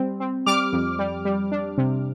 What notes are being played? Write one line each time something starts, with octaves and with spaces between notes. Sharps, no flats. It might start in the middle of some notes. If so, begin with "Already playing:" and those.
Already playing: G3 C4
C4
G3 D6 F6
F2
G3
G3
D4
C3